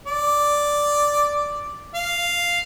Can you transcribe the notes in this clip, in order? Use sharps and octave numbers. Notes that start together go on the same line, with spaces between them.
D5
F5